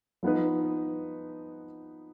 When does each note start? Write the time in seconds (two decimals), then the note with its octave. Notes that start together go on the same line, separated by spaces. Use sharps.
0.23 F3 B3 D#4 B4